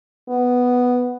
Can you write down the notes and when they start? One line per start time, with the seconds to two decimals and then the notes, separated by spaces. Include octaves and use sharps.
0.29 B3